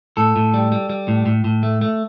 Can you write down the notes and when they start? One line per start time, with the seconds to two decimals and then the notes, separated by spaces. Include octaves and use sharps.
0.17 A2 A4
0.36 A2
0.54 G3
0.72 G3
0.90 G3
1.08 A2
1.26 A2
1.44 A2
1.63 A3
1.81 A3